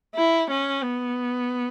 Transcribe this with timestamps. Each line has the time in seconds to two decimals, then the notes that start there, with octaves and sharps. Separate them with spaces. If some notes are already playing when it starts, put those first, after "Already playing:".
0.15 E4
0.50 C#4
0.83 B3